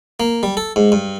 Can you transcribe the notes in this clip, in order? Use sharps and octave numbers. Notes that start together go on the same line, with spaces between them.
A#3
G3
A4
G#2
G2